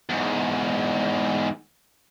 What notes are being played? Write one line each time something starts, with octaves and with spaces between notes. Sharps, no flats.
E2 G#2